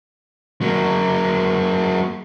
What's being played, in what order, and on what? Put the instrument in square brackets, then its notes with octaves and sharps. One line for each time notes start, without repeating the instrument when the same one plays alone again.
[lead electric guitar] F#3 A#3